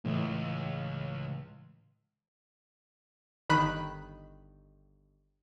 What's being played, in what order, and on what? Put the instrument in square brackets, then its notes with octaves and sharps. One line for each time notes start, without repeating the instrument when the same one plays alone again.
[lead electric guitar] C#2 [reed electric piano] A2 E3
[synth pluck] G1 D#3 B5 F#6